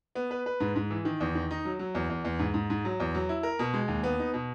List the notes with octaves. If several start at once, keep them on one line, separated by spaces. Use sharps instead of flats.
B3
B4
B4
G#2
G#2
E3
D#3
E2
D#3
D#4
F#3
F#3
E2
E2
E2
G#2
G#2
G#2
F#3
E2
F#3
E4
A#4
B2
G#3
D#2
B3
D#4
B2